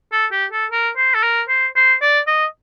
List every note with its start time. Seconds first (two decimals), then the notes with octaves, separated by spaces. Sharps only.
0.12 A4
0.32 G4
0.52 A4
0.71 A#4
0.97 C5
1.14 A4
1.23 A#4
1.49 C5
1.76 C5
2.02 D5
2.27 D#5